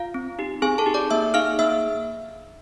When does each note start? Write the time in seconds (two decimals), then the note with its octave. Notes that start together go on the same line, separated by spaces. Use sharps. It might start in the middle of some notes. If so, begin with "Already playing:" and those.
Already playing: F4 F5
0.14 C4
0.39 D#4 G4
0.62 C4 G#4 G#5
0.78 A4 A5
0.86 D#4 G4
0.94 D5 D6
1.10 A#3 E5 E6
1.34 D#4 G#4 F5 F6
1.59 A#3 E5 E6